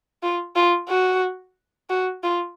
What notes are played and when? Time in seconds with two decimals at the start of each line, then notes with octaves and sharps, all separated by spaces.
0.23 F4
0.56 F4
0.89 F#4
1.90 F#4
2.23 F4